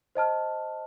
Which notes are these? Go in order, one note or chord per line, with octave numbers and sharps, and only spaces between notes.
C5 D#5 A5 F6